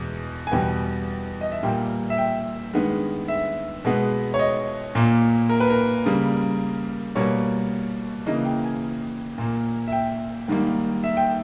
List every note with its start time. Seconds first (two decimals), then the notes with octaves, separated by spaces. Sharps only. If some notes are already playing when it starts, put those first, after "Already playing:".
Already playing: E2 B2 G#3
0.47 G#5
0.52 E2 B2 G3 B3 G5
1.41 D#5
1.52 E5
1.63 A#2 G3 A#3 G5
2.10 E5
2.18 G5
2.73 G2 D#3 G#3 B3
3.28 E5
3.85 B2 G#3 B3
4.34 C#5
4.39 D#5
4.95 A#2 A#3
5.50 A#4
5.60 B4
5.70 A#4
6.06 C#3 G3 A#3
7.15 B2 G3 A#3 C#5
8.26 C#3 E3 A#3 D#5
8.45 G5
8.64 G#5
9.38 A#2 A#3
9.88 E5
9.92 G5
10.48 G#2 D#3 G3 A#3
11.04 E5
11.17 G5